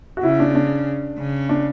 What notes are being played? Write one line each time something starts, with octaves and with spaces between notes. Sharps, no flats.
F#4
C#3 E4
D4
D4
C#3
D4